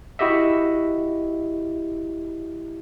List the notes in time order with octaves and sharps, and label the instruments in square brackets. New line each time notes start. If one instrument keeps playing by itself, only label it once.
[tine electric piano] E4 F#4 G4 D#5 E5